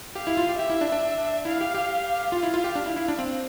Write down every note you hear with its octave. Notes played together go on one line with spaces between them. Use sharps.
G4 F5
E4
F4
G4
G4 E5
E4
D4
D4
E4 F5
G4
G4
F4 F5
E4
F4
G4
D4
E4
E4
D4
C4